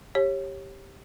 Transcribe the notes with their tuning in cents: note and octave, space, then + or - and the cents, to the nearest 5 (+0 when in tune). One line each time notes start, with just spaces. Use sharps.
G4 +0 C#5 -20